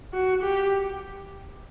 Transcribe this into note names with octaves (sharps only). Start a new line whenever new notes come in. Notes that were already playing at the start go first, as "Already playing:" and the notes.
F#4
G4